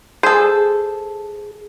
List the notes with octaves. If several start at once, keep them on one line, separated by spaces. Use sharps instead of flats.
G#4 A4 C5